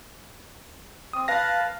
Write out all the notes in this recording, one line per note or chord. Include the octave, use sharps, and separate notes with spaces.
C4 D#6
B4 F5 A5 A#6